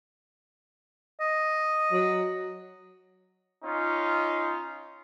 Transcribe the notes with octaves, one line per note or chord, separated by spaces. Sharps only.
D#5
F#3
C#4 D#4 F4